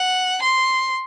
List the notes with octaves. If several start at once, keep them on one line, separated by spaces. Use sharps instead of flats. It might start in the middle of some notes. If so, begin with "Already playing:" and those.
Already playing: F#5
C6